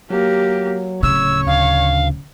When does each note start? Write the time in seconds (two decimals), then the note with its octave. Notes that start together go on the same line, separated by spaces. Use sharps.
0.10 F#3 A#3 G4
1.03 D1 C#3 C#5 E6
1.47 D2 F5